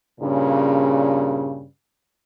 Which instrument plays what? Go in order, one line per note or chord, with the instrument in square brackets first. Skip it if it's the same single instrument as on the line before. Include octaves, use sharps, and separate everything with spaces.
[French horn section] G2 A#2 C#3